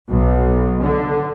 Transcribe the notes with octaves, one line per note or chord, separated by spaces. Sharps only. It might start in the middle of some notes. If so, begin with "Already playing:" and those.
B1
D3